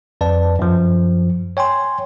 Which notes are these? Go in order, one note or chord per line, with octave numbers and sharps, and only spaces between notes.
F2 B4 D5 A5
F#2 F3
C#5 G5 G#5 C6